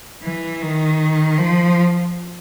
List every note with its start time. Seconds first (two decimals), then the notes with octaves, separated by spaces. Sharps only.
0.23 E3
0.62 D#3
1.38 F3